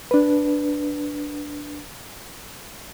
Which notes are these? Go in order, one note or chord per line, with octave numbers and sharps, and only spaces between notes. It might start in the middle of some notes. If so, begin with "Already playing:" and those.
D4 B4